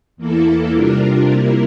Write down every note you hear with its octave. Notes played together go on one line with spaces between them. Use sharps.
E2 E3 A#3 E4 A4
C3 G3 D4 F4 A#4
C3 G3 A#3 E4 A#4